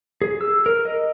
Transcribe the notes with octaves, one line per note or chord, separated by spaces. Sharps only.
G#4
E6
A#4
D#5